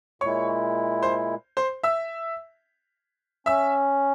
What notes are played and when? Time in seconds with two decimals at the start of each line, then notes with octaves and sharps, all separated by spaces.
0.21 A#2 G#3 E4 C#5 C#6
1.03 C5 C6
1.57 C5 C6
1.83 E5 E6
3.46 C#4 E5 E6